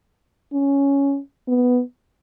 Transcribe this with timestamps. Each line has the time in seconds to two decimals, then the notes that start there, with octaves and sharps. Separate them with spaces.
0.53 C#4
1.48 B3